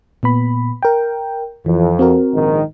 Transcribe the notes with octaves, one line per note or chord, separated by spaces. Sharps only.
A#2 B3 B5
A#4 G5
F2 E3
C4 F#4 A#4
A#1 G#2 D#3